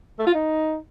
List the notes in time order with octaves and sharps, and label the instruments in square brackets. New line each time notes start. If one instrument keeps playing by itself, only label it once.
[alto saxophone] A3
F4
D#4